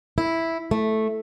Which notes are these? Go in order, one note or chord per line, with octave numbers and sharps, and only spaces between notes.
E4
A3